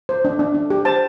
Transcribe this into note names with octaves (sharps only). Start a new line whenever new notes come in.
C5
D4
D4
D4
G4
C5 A5